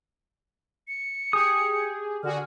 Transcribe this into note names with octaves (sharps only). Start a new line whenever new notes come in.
C#7
G4 G#4 D#6
D3 F#4 G#4 F6